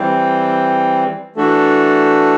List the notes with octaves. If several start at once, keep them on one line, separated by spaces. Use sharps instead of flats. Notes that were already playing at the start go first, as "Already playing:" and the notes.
Already playing: E3 G3 C4
E3 A3 D4 F#4 A4